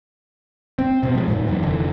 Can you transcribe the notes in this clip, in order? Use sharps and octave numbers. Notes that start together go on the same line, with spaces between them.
C4
B2 C4
F3 G#3
G2 A#2 D#3
F#2 D#3 E3
F1 D3 E3